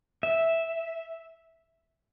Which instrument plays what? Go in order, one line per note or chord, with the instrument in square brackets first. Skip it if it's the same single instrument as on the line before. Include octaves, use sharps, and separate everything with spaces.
[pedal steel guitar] E5